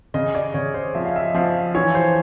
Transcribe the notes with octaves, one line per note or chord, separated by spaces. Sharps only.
C#3 D#5
D5
C#3 C#5
C5
F3 E5
F5
E5
F3 F5
E3 C#5
C5